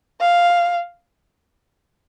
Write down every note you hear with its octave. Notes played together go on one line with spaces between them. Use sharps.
F5